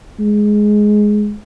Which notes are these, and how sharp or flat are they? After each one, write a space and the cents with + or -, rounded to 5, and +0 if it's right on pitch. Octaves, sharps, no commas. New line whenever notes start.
G#3 +10